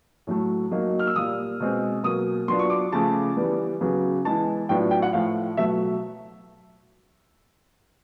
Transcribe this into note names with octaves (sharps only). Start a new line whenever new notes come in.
A2 F#3 A3
F#3 A#3 D#4
F6
E6
A#2 G3 A#3 D#6
B2 G#3 C4
B2 F#3 A#3 D#6
F#3 B3 D4 F4 C6
C#6
D6
C#3 F3 A3 A5
E3 G3 B3
C#3 F#3 B3
E3 G#3 B3 E4 A5
A2 F#3 B3 D4 F4 G5
G5
F#5
A2 F3 A3 F5
B2 F#3 A3 E5